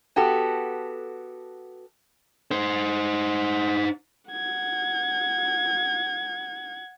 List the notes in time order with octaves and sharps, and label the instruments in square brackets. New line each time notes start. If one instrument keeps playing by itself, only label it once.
[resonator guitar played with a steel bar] B3 F#4 G4 A4
[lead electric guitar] D#4 C5
[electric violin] F#5 G#6